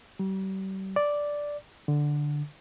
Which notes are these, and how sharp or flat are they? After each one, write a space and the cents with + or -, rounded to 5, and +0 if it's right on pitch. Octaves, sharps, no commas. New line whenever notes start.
G3 -40
D5 -5
D3 +5